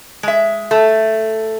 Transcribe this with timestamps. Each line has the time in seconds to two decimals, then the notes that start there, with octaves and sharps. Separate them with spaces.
0.23 G#3 E5
0.71 A3